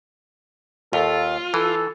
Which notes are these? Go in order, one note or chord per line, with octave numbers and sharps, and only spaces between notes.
D#2 F4 A4
E3 A4